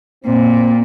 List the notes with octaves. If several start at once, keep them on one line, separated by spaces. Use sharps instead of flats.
A#2 C4